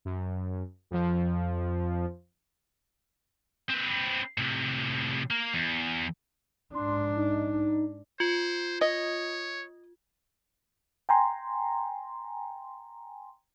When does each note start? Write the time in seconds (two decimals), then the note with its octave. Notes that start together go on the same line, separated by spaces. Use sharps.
0.05 F#2
0.91 F2 F3
3.69 C4 B4
4.38 A2 C3
5.30 A#3
5.54 E2
6.75 G#2 D4 C6
7.16 D#4
8.20 F4 C5
8.81 C#5 D#5
11.09 G5 G#5 A#5 C6